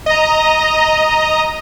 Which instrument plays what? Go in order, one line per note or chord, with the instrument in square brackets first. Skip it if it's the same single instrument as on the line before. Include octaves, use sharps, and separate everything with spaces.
[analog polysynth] D#5 A#5